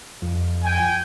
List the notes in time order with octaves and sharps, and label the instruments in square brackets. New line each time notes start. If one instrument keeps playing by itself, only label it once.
[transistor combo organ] F2
[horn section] G5 G#5